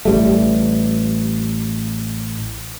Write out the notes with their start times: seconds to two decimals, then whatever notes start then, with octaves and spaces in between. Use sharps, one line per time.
0.05 A1 G3 A3